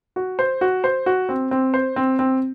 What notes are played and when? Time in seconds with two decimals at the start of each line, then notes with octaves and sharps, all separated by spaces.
0.16 F#4
0.39 C5
0.61 F#4
0.84 C5
1.06 F#4
1.29 C4
1.51 C4
1.74 C5
1.96 C4
2.19 C4